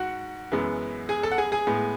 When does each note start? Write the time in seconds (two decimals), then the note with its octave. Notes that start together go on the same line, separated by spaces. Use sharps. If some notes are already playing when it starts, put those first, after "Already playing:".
Already playing: G#2 F#4 F#5
0.52 F#2 E3 G#3 B3
1.09 G#4 G#5
1.23 A4 A5
1.31 F#5
1.38 G#4 G#5
1.52 G#4 G#5
1.67 A2 G#3 B3